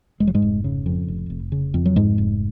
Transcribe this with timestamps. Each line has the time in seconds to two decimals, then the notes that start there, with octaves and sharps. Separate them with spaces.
0.20 F1 G#3
0.28 F#3
0.34 G#2 G#3
0.42 F1
0.64 C#3
0.86 F2
1.08 F1
1.30 F1
1.52 C#3
1.74 F2
1.86 F#3
1.96 F1 G#2 G#3
2.18 F1